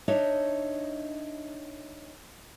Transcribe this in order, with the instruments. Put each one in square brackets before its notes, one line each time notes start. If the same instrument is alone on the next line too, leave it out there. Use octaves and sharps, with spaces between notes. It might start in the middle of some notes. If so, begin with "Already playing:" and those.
[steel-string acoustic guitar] D4 D#4 C#5 D#5 E5